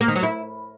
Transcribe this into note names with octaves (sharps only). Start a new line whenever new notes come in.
A#3
D#3
F#3
E4